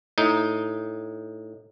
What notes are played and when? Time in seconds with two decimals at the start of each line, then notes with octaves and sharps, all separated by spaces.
0.18 A2 D#4